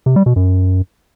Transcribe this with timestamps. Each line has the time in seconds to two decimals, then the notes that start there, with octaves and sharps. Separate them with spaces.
0.06 C3
0.16 G3
0.26 B2
0.36 F#2